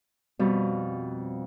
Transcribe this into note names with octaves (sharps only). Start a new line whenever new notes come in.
F2 B2 G3